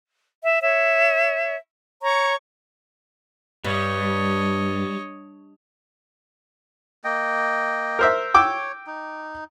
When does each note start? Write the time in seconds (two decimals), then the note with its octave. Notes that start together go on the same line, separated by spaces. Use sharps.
0.43 E5
0.61 C#5 E5
2.02 C#5 A#5 C#6
3.65 G2 G3 C#5 D#5
7.04 A#3 D#5 G5
7.99 A#4 C5 E5
8.34 C#5 G5 D6 E6
8.87 D#4